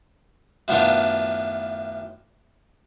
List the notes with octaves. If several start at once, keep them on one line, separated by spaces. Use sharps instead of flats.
F#2 A2 D#3 B3 D4 F4